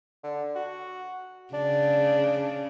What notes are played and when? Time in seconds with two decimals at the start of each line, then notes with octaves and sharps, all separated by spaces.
0.23 D3
0.55 F#4
1.54 C#3 D4